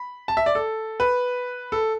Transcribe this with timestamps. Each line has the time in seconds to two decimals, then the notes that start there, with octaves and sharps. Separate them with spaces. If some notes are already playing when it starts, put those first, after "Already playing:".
Already playing: B5
0.28 A5
0.37 E5
0.46 D5
0.55 A4
1.00 B4
1.72 A4